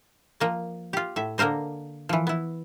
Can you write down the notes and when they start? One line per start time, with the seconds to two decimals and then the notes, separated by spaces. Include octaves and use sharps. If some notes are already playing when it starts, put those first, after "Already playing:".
0.40 F3 A#3 D#5
0.93 F4 G4
1.16 A2 E5
1.38 D3 A#3 A#4 C5 D#5
2.09 E3 F3
2.27 B3 E4